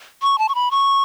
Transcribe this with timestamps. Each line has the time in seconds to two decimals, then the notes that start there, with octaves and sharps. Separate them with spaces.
0.22 C#6
0.39 A5
0.49 C#6
0.55 B5
0.71 C#6